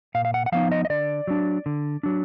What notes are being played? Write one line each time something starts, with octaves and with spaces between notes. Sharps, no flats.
A#2 F5
F5
F#5
F#5
F3 B3 D#4 F5
D#5
D#5
D3 D5
F#3 D4
D3
F#3 D4